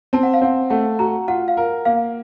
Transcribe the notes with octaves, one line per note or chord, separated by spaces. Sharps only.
C4 A5
F#5
F5
C4 F#5
A3 F#5
F#4 A#5
F4 F#5
F5
A#4
A#3 F5